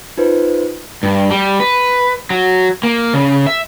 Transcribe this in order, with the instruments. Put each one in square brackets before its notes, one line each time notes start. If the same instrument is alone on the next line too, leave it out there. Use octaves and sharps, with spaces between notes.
[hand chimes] D#4 F4 B4 C5
[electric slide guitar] G2
G3
B4
F#3
A#3
C#3
E5